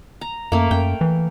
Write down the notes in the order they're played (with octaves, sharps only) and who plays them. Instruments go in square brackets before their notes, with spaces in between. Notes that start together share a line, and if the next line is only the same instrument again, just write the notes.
[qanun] A#5
[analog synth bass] F#2 [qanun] A3 A#3
[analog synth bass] F#2 [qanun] G5
[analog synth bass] E3